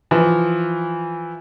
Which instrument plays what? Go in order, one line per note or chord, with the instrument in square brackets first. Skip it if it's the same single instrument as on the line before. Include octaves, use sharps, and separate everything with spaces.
[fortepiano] E3 F3